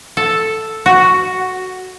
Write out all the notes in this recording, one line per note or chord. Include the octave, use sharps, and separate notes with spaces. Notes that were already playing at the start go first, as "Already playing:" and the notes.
A4
F#4